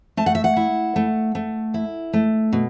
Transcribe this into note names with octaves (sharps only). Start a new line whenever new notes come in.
A3 A5
F#5
E5
F#5
E4
A3
A3
E4
A3
B2